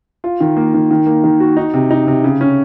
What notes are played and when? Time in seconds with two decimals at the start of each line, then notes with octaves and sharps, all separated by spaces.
0.24 F4
0.40 D#3
0.57 A#3
0.74 D#3
0.91 D#3
1.07 A#3
1.24 D#3
1.40 F#4
1.57 D#4
1.74 C3
1.90 D#4
2.07 C3
2.24 C#3
2.41 C#4